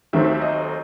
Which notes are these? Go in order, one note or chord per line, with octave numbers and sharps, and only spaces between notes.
D#2 D#3 F#3 A3 C4 E5
D#5